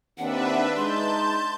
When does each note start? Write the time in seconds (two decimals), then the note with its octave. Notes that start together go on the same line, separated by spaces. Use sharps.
0.18 D#2 C4 D4 B4 E5 F#5
0.77 G#3 D#4 A5 C6 G6